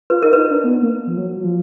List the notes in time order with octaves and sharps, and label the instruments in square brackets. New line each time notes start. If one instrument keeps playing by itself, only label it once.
[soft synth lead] F4 [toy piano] B4
[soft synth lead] D#4 [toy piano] A#4
[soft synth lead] D#4 [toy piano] B4
[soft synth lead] D4
B3
A#3
F3
F#3
F#3
F3